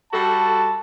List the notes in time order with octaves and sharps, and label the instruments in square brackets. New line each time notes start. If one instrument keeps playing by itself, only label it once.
[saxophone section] G3 F#4 A4 [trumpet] A5